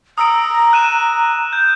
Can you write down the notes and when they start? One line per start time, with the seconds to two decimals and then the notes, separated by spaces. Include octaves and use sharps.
0.18 A#5 D#6 E6 D7
0.73 F#6 D#7 E7
1.53 G6